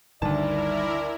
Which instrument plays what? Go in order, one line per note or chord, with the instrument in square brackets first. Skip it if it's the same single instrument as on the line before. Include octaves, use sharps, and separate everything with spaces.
[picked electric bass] G1 G2 D#3 [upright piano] D2 A5 [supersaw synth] E4 A#4 [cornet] D5